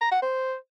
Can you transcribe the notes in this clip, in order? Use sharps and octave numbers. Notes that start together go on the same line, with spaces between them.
A#5
F#5
C5